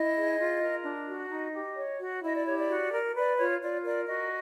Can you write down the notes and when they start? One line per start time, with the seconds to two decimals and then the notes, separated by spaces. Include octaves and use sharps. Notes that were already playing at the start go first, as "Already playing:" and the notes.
Already playing: E4 D#5
0.16 G#4
0.38 F4
0.61 A#4
0.85 D4
1.07 F#4
1.30 D#4 D#5
1.54 G4
1.77 C#5
1.99 F#4
2.23 E4 D#5
2.34 D5
2.46 G4 C#5
2.56 D5
2.69 F#4
2.92 A#4
3.15 B4 D5
3.38 F4 C#5
3.62 F4 D5
3.84 A#4 D5
4.07 F#4 D#5